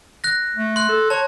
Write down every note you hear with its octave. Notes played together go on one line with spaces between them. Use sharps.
F#6 A#6
A3
C6 F#6
A4
C#5 A5